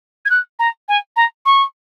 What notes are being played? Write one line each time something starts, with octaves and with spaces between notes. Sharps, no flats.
G#6
F#6
A#5
G#5
A#5
C#6